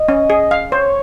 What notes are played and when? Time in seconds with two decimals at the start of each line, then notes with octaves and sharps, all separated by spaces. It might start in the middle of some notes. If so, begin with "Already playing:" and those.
Already playing: D#5
0.09 C#4
0.30 G#4
0.51 F5
0.72 C5 C#5